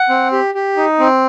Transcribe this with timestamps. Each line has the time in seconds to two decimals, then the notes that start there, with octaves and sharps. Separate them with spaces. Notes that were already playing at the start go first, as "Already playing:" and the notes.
Already playing: F#5
0.10 C4
0.32 G4
0.55 G4
0.77 D#4
1.00 C4